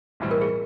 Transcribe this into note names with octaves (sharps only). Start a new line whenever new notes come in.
B1 A2 E3 G3 C4
A#4
G#4